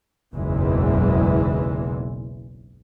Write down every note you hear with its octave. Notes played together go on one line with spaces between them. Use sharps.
F#1 B1 E2 E3 G#3